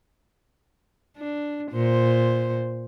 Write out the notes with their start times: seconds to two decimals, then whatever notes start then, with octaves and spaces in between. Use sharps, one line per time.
1.17 D4
1.72 A#2 C5